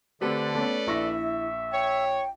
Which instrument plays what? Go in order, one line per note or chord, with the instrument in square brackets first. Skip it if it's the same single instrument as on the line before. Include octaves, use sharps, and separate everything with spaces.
[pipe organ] D3 [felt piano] A3 C4 G4 [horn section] A4 B4 D5
[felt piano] A3 C#4 [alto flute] B3
[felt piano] A#1 C#6 A#6 [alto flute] E4 [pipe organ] E5
[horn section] C#5 [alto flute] G5